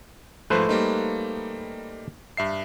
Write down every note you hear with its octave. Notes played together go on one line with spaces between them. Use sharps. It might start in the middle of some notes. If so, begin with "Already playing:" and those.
G#2 F3 A3 B4 C5 F#6
G3 A#3 D#4
G2 E5 C7